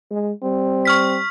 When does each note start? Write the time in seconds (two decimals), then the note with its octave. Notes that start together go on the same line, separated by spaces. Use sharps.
0.11 G#3
0.43 G3 C4
0.85 C#6 F6 B6